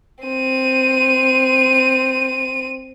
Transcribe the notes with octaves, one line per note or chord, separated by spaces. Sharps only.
C4 D#7